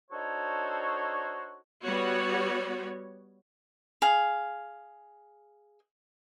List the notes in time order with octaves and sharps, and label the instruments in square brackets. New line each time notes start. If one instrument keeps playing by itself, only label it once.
[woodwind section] D4 D#4 F#4 A4 C5 C#5
[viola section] G3 B3 F#4 C#5
[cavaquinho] G#4 F5